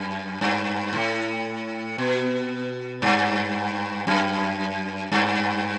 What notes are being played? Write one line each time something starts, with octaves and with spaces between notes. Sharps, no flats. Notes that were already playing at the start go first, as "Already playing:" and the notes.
Already playing: F#2
G2
A2
B2
G2
F#2
G2